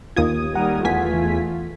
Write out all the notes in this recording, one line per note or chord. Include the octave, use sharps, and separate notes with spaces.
D#2 A#3 F4 D#6 G#6
D#3 G3 A#4 F#5
E2 A3 F4 G#5 B6
E3